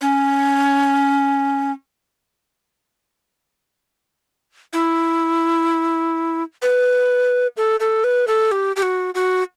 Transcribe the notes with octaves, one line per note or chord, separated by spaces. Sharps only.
C#4
E4
B4
A4
A4
B4
A4
G4
G4
F#4
F#4